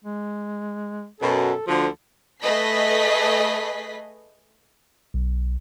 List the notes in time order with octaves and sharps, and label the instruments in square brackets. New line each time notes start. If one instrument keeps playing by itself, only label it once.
[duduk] G#3
[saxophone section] F#2 B2 [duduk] A4
[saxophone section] D2 D3 F3 [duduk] A4
[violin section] A3 G#4 B4 D#5 B6 C7
[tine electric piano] B1